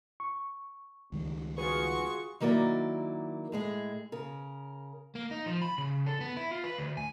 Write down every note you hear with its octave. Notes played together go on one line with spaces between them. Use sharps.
C#6
C#2 D#3 G3
F4 F#4 G#4 B4 C#6
D#3 F#3 A#3 E4 D5
A2 G#3 G#4
C#3 A#4
A#3
D#4
F3
B5
C#3
A4
B3
E4
F4
B4
D2
G#5